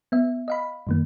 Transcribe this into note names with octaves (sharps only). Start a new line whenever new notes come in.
B3 E5
D#5 F5 B5
F#2 D#3 A#3